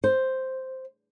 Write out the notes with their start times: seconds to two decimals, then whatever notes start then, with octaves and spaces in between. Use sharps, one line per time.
0.04 C5